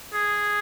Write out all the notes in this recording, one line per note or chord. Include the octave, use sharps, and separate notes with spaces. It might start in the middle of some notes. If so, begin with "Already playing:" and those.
G#4